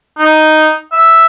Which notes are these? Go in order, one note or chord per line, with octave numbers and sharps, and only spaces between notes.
D#4
E5